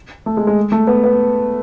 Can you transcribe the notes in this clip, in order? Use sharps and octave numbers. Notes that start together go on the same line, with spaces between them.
A3
G#3
G#3
A3
B3
B3